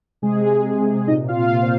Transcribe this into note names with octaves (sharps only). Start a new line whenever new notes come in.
C3 G#3 G#4
C3
A#2 D#4 D#5
F4 F5
A#2
C5